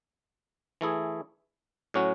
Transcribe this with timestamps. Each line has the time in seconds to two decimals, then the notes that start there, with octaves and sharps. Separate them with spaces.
0.81 E3 A3 E4 G#4
1.94 A2 F#3 C#4 F#4